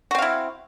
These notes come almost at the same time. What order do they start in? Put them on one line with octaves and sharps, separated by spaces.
F#4 C4 F5 E4